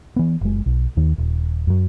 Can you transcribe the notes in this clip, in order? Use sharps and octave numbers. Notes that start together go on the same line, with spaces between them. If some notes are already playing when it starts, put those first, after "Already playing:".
E3 B3
F#1 G#3
B1
D#2 D#3
D#1
F#2 F#3